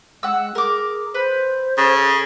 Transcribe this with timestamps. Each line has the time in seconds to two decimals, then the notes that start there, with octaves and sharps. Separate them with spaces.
0.23 G#3 F#5 E6
0.55 G#4 A#4 D6
1.14 B4 C5
1.78 C#3 A4